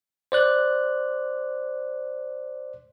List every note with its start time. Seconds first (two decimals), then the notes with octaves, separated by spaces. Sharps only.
0.32 C5 D5 F#6